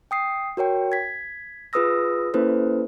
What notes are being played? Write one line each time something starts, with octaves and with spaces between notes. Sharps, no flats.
G5 D#6 C7
F#4 A#4 C#5 G5
G#6 B6
F4 G#4 B4 D#6 E6 A#6
A#3 C#4 E4 A4 B4 C5